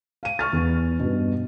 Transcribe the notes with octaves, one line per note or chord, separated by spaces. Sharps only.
F5 D#7
C#6 F6 A6
E2
G2 B2